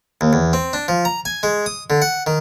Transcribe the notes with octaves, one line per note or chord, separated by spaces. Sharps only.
D#2
E2
C4
D4
F3
A#5
G#5
G#3
D#6
D3
F#5
D#3